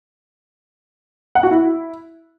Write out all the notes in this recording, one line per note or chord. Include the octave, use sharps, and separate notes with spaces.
F#5
F#4
E4